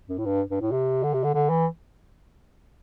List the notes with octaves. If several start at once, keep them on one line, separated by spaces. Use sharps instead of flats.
F#2
A2
G2
G2
A2
C3
D3
C3
D3
D3
E3